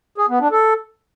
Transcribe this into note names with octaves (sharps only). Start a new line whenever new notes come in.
G#4
B3
D4
A4